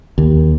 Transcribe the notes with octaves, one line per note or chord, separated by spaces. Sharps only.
D#2